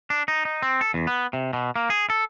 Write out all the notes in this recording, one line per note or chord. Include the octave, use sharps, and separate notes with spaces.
D4
D#4
D#4
C4
A4
E2
B3
C3
B2
A#3
G#4
A4